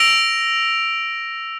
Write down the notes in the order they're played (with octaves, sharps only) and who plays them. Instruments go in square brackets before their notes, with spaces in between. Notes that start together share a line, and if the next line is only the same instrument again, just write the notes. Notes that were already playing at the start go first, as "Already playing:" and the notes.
Already playing: [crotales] E6 A#6 D7 F7